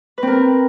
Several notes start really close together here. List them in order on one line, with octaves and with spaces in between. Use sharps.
B4 C4 A#4